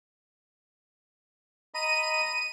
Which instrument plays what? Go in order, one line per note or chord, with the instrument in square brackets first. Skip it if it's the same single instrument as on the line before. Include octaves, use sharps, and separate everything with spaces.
[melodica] D#5 A#5 B5 [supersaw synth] D#7